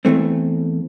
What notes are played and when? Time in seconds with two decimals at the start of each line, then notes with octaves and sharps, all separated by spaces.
0.05 E2 G#2 E3 A3 C4